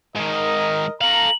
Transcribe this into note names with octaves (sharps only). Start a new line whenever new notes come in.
G#2 D#3 A#4 D#5
A4 F5 A#5 F#7